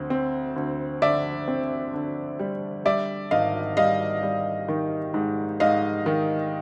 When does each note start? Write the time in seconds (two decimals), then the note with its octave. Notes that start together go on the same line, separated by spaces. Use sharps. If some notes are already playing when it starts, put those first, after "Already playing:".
Already playing: D2 C4
0.10 C4
0.56 D2
1.02 D3 D5 E5
1.48 C4
1.94 D3
2.39 G3
2.85 G3 D5 E5
3.31 G#1 D#5 F5
3.77 G3 D#5 F5
4.23 G3
4.68 D#3
5.14 G#2
5.60 G#2 D#5 F5
6.06 D#3